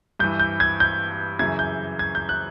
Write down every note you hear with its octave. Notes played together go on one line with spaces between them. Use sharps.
G2 E3 G6
G6
G#6
G6
F#2 C#3 E3 G#6
G6
G#6
G6
F#6